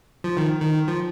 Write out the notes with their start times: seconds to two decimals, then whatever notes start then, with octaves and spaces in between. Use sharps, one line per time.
0.24 F3
0.37 D#3
0.60 D#3
0.88 F3